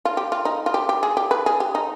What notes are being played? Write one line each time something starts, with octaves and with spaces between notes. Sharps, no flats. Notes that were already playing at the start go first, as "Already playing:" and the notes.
F4
G4
F4
D#4
F4
G4
G4
G#4
G4
B4
G#4
G4
D#4